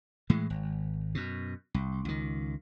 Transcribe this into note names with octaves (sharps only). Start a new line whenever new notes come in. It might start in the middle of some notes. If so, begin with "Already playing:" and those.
A2 E3 G#3
G#1
F#2 B2
C2
C#2 D#3